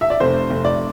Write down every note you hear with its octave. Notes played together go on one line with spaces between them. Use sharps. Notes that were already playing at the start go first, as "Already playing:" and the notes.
E5
D5
F1 C5
F1
D5